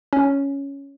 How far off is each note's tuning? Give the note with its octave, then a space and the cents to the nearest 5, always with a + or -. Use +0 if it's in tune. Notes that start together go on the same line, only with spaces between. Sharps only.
C#4 +5